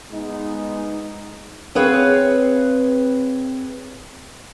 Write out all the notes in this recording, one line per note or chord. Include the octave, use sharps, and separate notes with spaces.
G#3 B3 D#4
C4 G#4 B4 C#5 F5